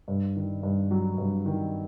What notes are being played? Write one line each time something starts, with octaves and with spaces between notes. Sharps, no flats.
G2
D#3
G2
F#3
G2
D#3